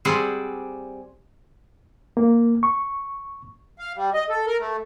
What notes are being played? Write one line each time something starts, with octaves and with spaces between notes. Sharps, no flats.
G3 C4 G#4 C5 D5 F#5
A#3
C#6
F5
G3
D#5
A4
A#4
A3